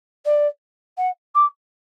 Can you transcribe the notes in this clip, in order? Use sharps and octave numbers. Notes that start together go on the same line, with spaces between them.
D5
F#5
D6